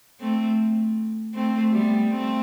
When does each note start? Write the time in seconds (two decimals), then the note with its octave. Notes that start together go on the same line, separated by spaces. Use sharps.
0.20 A3 C4
1.34 A3 C4
1.72 G3 B3
2.11 A3 C4